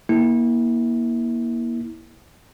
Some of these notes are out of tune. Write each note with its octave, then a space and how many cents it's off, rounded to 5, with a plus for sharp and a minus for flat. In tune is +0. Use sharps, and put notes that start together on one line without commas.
A#3 +25 E4 -25